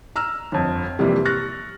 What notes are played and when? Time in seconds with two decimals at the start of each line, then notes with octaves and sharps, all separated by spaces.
0.16 A#5 E6 F6
0.52 G1 F2
0.99 C3 E3 F3 G3 A#3
1.25 C#6 F6 F#6 A6 A#6